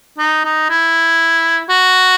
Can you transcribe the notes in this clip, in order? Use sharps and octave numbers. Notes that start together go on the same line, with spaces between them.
D#4
D#4
E4
F#4